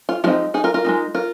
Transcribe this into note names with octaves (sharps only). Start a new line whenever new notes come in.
F4
F3 G#3 C4 D#4 F4
D#4 G#4
F4 A#4
F4 A#4
G#3 C4 D#4
F4 A#4